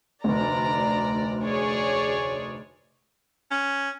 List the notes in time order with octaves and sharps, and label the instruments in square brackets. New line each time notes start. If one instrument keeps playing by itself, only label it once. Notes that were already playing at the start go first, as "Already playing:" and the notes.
[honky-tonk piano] F1 D2 [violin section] D5 A#5
[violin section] G#4 C#5 D5
[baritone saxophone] C#4